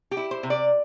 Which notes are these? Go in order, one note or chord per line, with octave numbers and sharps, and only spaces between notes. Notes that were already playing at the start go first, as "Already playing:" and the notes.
G4
E4
C5
C3
D5